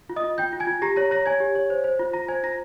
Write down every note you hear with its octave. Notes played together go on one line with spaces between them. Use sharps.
F4
D#5 D#6
F4
F4 G5 G6
F4
G#5 G#6
F4
G4 A#5 A#6
C#5 A#5 A#6
C#5 A#5 A#6
C#5 G#5 G#6
G4
C#5
C5
C5
F4
F4 A#5 A#6
C5 G#5 G#6
F4 A#5 A#6